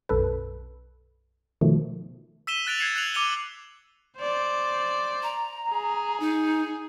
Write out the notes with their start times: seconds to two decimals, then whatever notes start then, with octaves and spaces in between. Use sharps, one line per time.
0.09 B1 F#2 A4 B4
1.61 B2 D#3 F3 A3
2.47 E6 B6 D#7 E7 G7
2.67 F#6 A6 D7 F7 F#7
2.78 G#6 C7 C#7 E7 F7
2.96 F#6 C7 C#7 F7 F#7
3.14 D6 E6 C#7 D#7 F7 G7
4.18 C5 D5
5.23 A#5
5.71 G#4
6.20 D#4